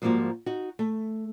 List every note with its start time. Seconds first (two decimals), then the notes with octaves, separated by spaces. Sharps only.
0.02 G#2 F3 G3 A#3 F4 F#4
0.46 D#4 F#4
0.79 A3